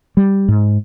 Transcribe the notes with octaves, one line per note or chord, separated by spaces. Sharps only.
G3
G#2